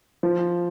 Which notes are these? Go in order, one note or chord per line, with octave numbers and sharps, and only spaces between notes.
F3